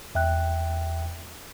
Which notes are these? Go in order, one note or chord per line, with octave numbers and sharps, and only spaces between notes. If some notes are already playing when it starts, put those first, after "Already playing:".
E2 E5 G5 F#6